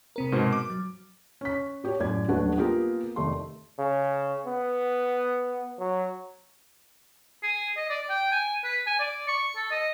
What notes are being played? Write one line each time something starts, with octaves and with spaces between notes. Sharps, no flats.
C3 C4 A#4
G#2 B2 C5
D6
F#3
C#4 B6
F#4 G4 C#5 D5
F#2 A2 D5 G#6
D#1 F#3 A3 D4 B4 F#5
A#3 B3 F4 G4 G#4 A#4
F1 D#3 A3 C6
C#3
B3
F#3
G#4
D#5
D5
G5
G#5
B4
G#5
D5
C#6
A4
D#5